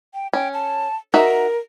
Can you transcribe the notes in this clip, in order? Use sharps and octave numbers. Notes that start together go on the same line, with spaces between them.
G5
C#4 G5
A5
D#4 F#4 A#4 E5